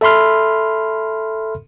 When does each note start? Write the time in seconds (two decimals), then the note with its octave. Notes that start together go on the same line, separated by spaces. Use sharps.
0.01 A4 E5 B5 C6 F6